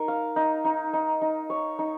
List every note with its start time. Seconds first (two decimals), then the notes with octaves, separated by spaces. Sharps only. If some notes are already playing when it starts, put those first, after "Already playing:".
Already playing: D#4 A#4
0.08 F5
0.36 D#4
0.65 D#4
0.93 D#4
1.22 D#4
1.50 C#5
1.79 D#4